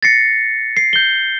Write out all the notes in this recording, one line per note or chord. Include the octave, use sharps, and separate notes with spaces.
A6 A#6 C7 C#7
C7
G6 G7